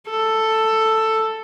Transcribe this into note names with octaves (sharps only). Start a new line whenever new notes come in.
A4